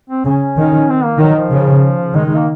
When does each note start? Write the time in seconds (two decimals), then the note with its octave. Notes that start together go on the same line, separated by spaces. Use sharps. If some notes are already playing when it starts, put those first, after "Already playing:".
0.10 C4
0.25 C#3 C#4
0.58 D#3
0.89 C4
1.04 A#3
1.20 D#3 F#3
1.36 F3
1.52 C#3
2.15 D#3 G#3
2.25 G#3
2.36 A#3